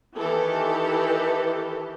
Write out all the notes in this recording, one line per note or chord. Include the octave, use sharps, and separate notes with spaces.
D#3 E3 G4 A4